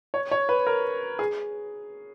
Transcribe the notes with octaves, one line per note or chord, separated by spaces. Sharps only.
C#5
C#5
B4
A#4
G#4